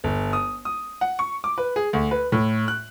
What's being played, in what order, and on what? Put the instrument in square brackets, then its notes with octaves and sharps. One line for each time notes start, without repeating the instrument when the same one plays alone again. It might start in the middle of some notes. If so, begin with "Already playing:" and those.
[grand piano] G1
D#6
D#6
F#5
C#6
D6
B4
G#4
D2
B4
A2
F#6